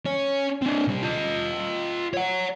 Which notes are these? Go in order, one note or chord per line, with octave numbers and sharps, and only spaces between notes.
C#4 C#5
C4 D4
C3 G3
F4 D#5
C#5 F#5